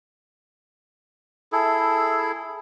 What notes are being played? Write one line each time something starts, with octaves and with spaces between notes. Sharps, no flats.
E4 G#4 A4